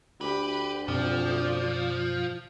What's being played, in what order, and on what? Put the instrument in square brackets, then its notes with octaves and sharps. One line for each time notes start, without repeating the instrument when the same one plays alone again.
[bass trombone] D2 [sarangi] G4 [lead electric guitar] B4
[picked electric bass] F#2 B2 C4 [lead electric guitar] F3 [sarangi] D5